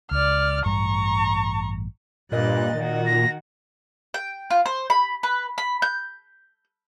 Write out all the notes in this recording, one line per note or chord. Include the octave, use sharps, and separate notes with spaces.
C#2 D5 F6
A1 G2 G3 A#5 C#6
G2 A#2 D#5 F#6 A6
D#3 F#4
A#6
G5
F4
C5
B5
B4
B5
G6